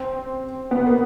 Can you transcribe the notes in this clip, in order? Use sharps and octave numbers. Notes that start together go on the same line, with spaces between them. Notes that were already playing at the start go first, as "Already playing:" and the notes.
Already playing: C4
B3
A#3